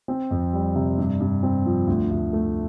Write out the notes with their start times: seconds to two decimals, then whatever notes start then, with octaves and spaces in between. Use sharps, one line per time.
0.08 C4
0.31 F2
0.53 G3
0.75 C3
0.98 G2
1.20 G2
1.43 C4
1.66 F3
1.87 D2
2.11 D2
2.33 A3